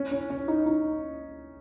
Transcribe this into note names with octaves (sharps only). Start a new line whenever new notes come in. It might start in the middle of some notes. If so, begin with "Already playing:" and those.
Already playing: C#4
C#4
C#4
D#4
D#4